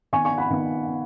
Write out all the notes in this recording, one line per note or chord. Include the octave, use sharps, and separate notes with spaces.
D#3 B3 G#5 C#6
G#5 C#6
F#5 B5
D#3 B3
B3